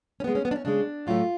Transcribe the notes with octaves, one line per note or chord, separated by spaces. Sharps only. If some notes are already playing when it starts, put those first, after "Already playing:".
C#4
C#3 G#3 B3
C#4
B3
D4
C#4
C#3 G#3 D4
A2 F#3 A3 F4